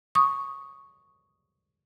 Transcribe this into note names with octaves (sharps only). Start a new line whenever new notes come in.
C#6 D#6